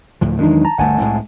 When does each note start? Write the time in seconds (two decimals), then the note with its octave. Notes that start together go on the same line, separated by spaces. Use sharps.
0.21 D2 A2 F3
0.39 E2 D#3 F#3 G#3 D4 D#4
0.65 A5 A#5
0.78 G1 D2 A3 F#5 G#5 A5
1.00 C2 A2 G#3